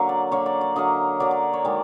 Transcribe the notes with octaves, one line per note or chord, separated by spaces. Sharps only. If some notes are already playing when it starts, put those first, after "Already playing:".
Already playing: D3 F#3 A#3
D5
D3 F#3 A#3 C#5
D5
D5
D3 F#3 A#3 D#5
D3 F#3 A#3 D5
D5
C#5
D#3 G#3 D5